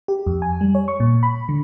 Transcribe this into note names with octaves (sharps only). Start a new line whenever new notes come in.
G4
F2
G#5
G3
C#5
C#6
A#2
B5
D3